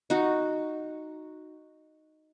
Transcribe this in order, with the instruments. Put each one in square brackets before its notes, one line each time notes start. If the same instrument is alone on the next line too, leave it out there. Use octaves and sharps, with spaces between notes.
[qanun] D#4 F#4